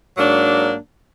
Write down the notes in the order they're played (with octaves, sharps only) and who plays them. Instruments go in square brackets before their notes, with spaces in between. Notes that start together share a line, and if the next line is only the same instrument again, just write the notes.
[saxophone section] G#2 F#3 A#3 D4